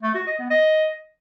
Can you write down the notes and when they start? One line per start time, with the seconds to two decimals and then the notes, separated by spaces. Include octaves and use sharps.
0.03 A3
0.15 F#4
0.27 D#5
0.39 B3
0.50 D#5